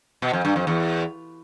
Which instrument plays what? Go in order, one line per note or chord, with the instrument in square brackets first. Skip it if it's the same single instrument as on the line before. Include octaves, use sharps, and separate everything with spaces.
[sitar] B2
F2
G2
F2
E2